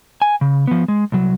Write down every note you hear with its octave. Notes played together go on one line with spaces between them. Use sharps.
G#5
C#3
F3 B3
G#3
C2 F#3